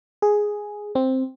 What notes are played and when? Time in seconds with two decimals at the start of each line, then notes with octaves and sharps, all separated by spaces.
0.22 G#4
0.95 C4